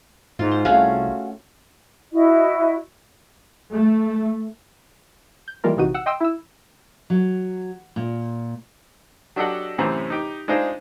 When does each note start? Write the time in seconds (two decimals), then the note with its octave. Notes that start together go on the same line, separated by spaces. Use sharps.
0.39 G#2 F4
0.51 C5
0.65 C2 A3 C#4 F#4 G#4 F5
2.12 E4 F#4 D#5
3.72 A3
5.48 G6
5.64 E3 G3 G#3 A#3 F4 A#4
5.76 A#1 C3 E3 D#4 F#4 D#7
5.94 F#5 E6
6.06 D#5 G5 C6 D#6 E6
6.21 E4 E6
7.10 F#3
7.96 A#2
9.36 F#3 D4 G4 A4 D#5 F#5
9.78 F#2 A2 C3 E3 C5 A#5
10.10 D#4 G4
10.48 G#3 D4 D#4 F4 C5 D#5